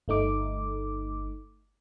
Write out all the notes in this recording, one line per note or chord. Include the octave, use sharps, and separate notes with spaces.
G1 A3 D#4 D6